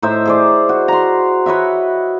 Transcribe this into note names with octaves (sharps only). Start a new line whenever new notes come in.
A2 D#4 C5 E5
G#4 C5 D5
F#4
A#5 C6
B4 C#5 D#5 E5